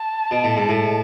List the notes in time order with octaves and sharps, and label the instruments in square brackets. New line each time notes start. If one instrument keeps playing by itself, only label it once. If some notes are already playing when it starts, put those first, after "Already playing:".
Already playing: [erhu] A5
[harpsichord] B2
A2
G#2
A2